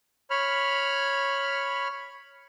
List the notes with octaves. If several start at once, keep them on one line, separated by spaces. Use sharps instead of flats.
C#5 B5 F6